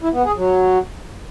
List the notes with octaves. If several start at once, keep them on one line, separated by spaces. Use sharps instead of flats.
E4
B3
G#4
F#3